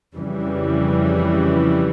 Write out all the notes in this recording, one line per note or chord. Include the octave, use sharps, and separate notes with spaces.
F2 C#3 E3 G3